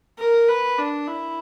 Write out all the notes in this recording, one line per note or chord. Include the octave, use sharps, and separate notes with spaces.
A#4
B4
D4
E4